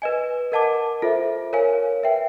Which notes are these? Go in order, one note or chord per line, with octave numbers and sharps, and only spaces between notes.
B4 D#5 G#5
A#4 D#5 F#5 A5 D6
F4 A4 C5 E5
A#4 C#5 F5 G#5
B4 E5 G5